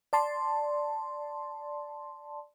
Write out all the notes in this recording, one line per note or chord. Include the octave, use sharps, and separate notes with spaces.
D5 A5 C6